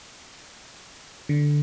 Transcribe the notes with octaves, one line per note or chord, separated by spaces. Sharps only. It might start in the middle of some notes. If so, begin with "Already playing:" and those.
D3